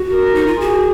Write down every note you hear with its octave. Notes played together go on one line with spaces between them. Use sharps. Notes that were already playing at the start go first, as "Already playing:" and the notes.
Already playing: F#4
A#4
D#4
F4
F#4 G#4